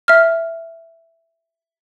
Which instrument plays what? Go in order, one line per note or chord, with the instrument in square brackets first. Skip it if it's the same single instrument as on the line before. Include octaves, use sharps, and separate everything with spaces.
[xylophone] E5 F6